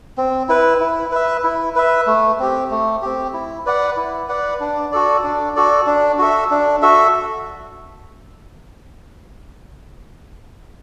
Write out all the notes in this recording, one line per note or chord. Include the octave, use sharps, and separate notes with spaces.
C4
E4 B4
E4
B4 E5
E4
B4 E5
A3
C4 G4
A3
C4 G4
E4
B4 D5 F#5
E4
B4 D5 F#5
D4
F#4 A4 D5
D4
F#4 A4 D5
D4
F#4 A4 E5
D4
F#4 A4 E5